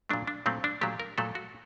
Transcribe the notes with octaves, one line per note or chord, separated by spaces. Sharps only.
A#2 F#3 A3 D4
D4
A#2 F#3 A3 C4
D4
A#2 F#3 A3 G4
A#4
A#2 F#3 A3 A4
F#4